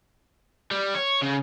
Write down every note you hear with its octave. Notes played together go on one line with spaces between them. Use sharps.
G3
C#5
C#3